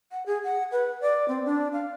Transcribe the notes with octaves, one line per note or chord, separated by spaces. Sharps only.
F#5
G#4
F#5
B4
D5
C4
D4
F5